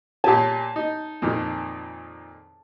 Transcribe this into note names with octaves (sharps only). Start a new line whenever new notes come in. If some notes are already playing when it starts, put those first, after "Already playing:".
A#2 G4 G#5 A5
D#4
F2 A#2 D#3